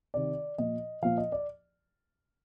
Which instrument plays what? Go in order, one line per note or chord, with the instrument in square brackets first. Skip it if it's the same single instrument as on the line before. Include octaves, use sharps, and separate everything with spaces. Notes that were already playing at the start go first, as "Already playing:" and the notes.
[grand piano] C3 D#3 D5
A#2 F3 D#5
A#2 F3 F5
D#5
D5